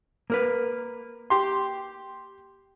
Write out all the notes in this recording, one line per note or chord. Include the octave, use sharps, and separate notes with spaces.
A#3 A#4 B4
G4 C6